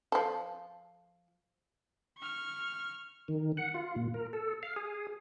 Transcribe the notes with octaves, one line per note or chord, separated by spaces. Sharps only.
F3 A4
C#6 F6
D#3
F#5
F4
A#2
A#4
A4
F5
G#4